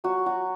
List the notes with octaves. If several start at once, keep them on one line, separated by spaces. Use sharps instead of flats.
F#3 F#4
F#4